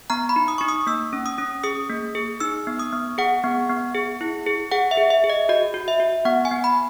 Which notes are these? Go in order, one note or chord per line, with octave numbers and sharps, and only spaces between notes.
B3 A#5
B5
D#4
D#6
D#4 C#6
D#6
A#3 E6
C#4
D#6
C#4
G#4 D#6
A#3
G#4
D#4 E6
B3
D#6
B3
G#4 F#5
B3
B3
G#4
E4
G#4
G#4 F#5
E5
G#4
E5
G#4
D#5
F#4 D#5
F#4
E5
F#4
B3 F#5
G#5
B3
B5